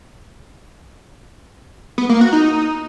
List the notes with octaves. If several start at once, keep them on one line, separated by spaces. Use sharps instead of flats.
B3
A#3
F#4
D#4